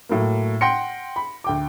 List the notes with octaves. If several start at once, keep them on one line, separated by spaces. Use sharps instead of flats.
A2 F#3 A#3
F#5 G5 C6 A#6 C#7
B5
D2 G5 D6